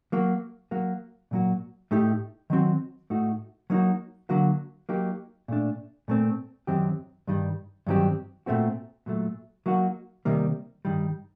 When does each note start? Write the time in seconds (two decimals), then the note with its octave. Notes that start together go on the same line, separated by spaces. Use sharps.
0.12 F#3 A#3 F#4
0.71 F#3 A#3 F#4
1.31 A#2 F#3 A#3 F#4
1.91 A2 A3 D#4 G4
2.50 D#3 F#3 C4 F#4
3.10 A2 A3 D#4 F#4
3.70 F#3 A#3 D#4 F#4
4.29 D3 F#3 A#3 F#4
4.89 F#3 A#3 D#4 G4
5.48 A#2 A3 D4
6.08 A#2 A3 C4
6.67 F#2 D#3 F#3 C4 G4
7.27 G2 D#3 G3
7.87 G2 D#3 F#3 C4 G4
8.46 A#2 A3 C4 F#4
9.06 A#2 F#3 A3
9.66 F#3 A#3 D#4 F#4
10.25 C3 D#3 G3 A#3
10.85 G2 D#3 G3